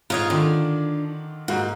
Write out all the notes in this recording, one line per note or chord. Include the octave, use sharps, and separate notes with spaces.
G#2 F4 C#5 F5 D#6 G#6
D3 D#3 D4 F4
G#2 A#3 F#4